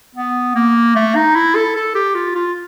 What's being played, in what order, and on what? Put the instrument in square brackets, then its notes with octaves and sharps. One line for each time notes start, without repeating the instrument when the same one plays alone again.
[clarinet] B3
A#3
A3
D#4
E4
A4
A4
G4
F4
F4